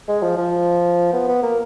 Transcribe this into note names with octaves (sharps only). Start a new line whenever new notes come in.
G#3
F3
F3
B3
B3
A#3